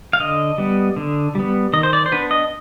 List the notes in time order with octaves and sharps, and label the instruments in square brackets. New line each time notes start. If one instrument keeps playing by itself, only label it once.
[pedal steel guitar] F5
D3 D#5
G3 B3
D3
G3 B3
D#3 D#5
C5
D5
C5
B3 D4 B4
D#5